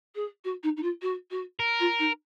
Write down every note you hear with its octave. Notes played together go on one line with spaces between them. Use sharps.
G#4
F#4
D#4
D#4
F4
F#4
F#4
A#4
F4
D#4